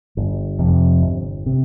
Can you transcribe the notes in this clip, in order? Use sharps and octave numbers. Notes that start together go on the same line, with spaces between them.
G1
F2 C3
G1
C3